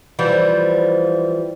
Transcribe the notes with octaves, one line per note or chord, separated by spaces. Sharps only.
E3 F3 G3